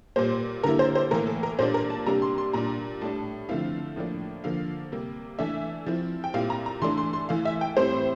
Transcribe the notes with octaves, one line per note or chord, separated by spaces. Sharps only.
A#2 G3 A#3 C5
D3 G3 A#3 E4 A#4
C5
C5
A2 E3 A#3 A#4
A4
A#4
A#2 G3 A#3 D4 C5
A#4
A5
C3 G3 A#3 D4 A#5
C6
C6
A#2 G3 D4 A#5
A2 G3 D4 A5
D3 F3 A3 C4 E4 F5
A2 F3 A#3 D4
D3 F3 A#3 F5
C3 G3 A#3
E3 A3 D4 E5
F3 C4 E4
G5
A#2 G3 C4 E4 F5
A#5
A#5
E3 A3 D4 C6
C6
C6
E3 A3 E4 F5
E5
G5
A2 G3 C4 E4 C5